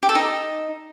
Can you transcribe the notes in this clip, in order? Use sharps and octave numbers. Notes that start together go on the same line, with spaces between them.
G4
A4
D#4